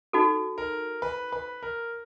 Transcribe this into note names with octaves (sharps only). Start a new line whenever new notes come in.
D#4 F#4 A4
A#4
B4
B4
A#4